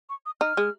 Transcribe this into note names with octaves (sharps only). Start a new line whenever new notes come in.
C#6
D#6
D#4 F6
G#3